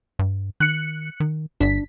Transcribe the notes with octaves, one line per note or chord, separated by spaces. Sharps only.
G2
D#3 F#6 C#7
D#3
G1 D4 B6